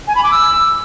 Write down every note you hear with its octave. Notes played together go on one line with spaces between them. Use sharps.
G#5
B5
D6
E6